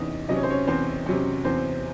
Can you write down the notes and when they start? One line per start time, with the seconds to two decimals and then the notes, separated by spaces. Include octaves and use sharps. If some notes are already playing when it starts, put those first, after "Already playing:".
Already playing: E2 C3 C#4 D#4 E4 D#5
0.29 C3 F#3 C#4 D#5
0.36 C#5
0.43 C5
0.50 C#4 C#5
0.67 E2 C4 C5
1.06 C3 F#3 C#4
1.44 E2 C4 C5